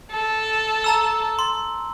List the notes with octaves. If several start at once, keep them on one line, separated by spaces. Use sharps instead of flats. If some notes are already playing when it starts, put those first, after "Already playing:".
A4
A5 A#5 E6
C6